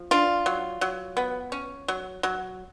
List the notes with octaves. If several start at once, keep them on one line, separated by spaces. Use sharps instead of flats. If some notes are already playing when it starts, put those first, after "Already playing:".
Already playing: F3
D4 F4
F#3
F#3
B3
C#4
F#3
F#3